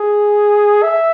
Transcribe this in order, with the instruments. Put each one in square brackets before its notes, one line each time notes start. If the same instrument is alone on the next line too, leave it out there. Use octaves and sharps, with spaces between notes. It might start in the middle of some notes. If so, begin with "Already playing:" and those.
Already playing: [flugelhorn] G#4
E5